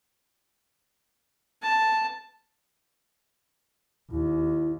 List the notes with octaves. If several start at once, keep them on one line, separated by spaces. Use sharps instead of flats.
A5
D#2 E4